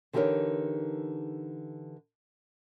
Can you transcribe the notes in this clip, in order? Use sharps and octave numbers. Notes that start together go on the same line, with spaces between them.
D3 E3 D#4 G4 A#4 C#5